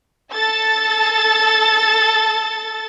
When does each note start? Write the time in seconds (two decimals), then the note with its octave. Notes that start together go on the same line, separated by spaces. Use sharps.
0.33 A4 A5 A6